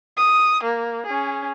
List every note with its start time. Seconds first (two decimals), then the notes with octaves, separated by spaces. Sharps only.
0.17 D#6
0.64 A#3
1.06 C#4 G#4